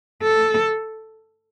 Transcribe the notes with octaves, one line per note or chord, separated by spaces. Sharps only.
A4